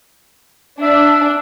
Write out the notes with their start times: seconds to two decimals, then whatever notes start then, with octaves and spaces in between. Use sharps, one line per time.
0.82 D4 E5